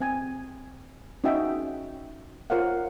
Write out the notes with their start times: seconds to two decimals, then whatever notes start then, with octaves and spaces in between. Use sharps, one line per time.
0.01 C4 G5 G#5
1.24 C#4 D#4 F#4 D#5 E5 G5
2.50 F4 A#4 C5 C#5 F5 F#5